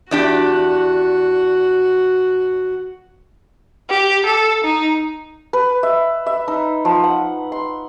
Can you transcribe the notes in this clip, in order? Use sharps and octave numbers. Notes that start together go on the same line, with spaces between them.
E2 D4 F#4 G4
G4
A4
D#4
B4
E5
E5
D#4
F3
F#5
C6